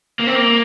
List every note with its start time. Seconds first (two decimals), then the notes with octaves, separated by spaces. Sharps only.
0.19 A#3
0.27 C4
0.35 A#3